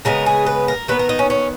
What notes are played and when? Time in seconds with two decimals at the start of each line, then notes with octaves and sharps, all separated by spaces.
0.05 C#3 G#3 B3 A#4
0.26 G#4
0.46 B4
0.68 A#4
0.88 D#3 G3 B3 B4
0.99 A#4
1.09 D#4
1.19 C#4
1.30 C#4